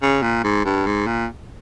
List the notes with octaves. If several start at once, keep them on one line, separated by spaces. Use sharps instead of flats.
C#3
A#2
G#2
G2
G#2
A#2